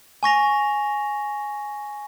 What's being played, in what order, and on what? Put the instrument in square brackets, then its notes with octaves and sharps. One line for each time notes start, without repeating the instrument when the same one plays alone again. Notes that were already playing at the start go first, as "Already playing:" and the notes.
[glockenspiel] G#5 C#6 A#6 F7